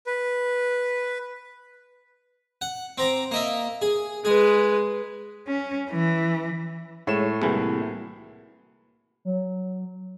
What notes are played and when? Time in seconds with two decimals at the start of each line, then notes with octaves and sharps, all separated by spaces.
0.07 B4
2.61 F#5
2.98 C4 A#5 D6
3.31 A#3 D#5 E5
3.82 G#4
4.25 G#3 G#4 B4
5.47 C#4
5.90 E3
7.07 A2 G#3 C#5 E7
7.42 C2 E3 A#3 F#4 G#4
9.25 F#3